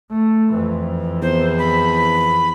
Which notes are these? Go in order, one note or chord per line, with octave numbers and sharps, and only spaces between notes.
A3
F2 E3
E2 C5
B5